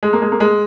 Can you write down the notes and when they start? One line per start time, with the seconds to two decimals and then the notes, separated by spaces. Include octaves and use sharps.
0.03 G#3
0.13 A#3
0.22 G#3
0.32 A#3
0.40 G#3